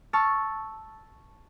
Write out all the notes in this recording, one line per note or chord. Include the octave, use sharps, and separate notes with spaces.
A5 C#6 E6 F6